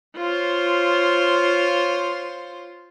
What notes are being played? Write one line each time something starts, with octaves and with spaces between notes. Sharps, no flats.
F4 C5 C#5